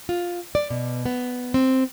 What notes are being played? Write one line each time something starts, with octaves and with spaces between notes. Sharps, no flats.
F4
D5
B2
B3
C4